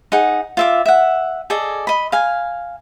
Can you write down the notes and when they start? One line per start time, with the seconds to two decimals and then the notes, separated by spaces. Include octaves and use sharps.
0.12 D#4 G#4 F#5
0.57 F4 E5 D6
0.86 E5 F#5
1.50 G#4 A4 D5 D#5
1.87 D#5 B5
2.12 F5 G#5